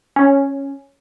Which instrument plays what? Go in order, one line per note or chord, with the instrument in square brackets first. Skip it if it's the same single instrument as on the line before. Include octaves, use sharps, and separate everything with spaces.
[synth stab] C#4